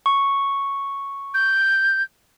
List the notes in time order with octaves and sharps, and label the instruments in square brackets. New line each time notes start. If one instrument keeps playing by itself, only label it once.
[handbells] C#6
[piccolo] G6